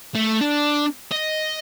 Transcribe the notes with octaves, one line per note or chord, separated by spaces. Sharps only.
A3
D4
D#5